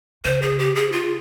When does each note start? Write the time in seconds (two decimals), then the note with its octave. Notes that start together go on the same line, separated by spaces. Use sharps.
0.25 C#3 C5
0.42 G#4
0.59 G4
0.75 G#4
0.92 F4